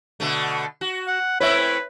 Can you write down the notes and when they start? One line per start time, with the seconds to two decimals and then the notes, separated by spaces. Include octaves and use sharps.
0.20 B2 D3 A3
0.81 F#4
1.07 F#5
1.41 A3 C4 E4 B4 C#5 E5